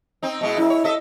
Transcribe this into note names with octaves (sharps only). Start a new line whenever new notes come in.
C4 D#4
B2 G#3 E4
F#2 E4
C#5
A4 D#5 E5